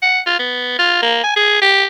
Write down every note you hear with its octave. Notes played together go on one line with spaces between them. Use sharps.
F#5
F4
B3
F4
A#3
G#5
G#4
G4